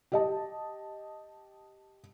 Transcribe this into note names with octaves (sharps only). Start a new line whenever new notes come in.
G4 D#5 A5